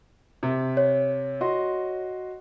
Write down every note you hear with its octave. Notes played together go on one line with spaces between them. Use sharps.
C3
C#5
F#4 D#5 C6